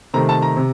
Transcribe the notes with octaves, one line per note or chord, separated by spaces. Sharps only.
C3 D#3 A3 C4 A#5
A5
A#5
C3